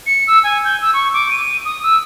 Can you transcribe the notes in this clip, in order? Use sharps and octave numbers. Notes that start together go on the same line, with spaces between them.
C#7
E6
G#5
G6
E6
C#6
D6
D#7
D#6
E6